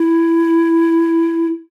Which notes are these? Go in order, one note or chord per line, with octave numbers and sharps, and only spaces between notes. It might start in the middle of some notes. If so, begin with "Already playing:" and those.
Already playing: E4